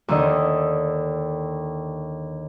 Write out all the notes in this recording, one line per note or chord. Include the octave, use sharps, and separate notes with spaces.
D#2 D3 D#5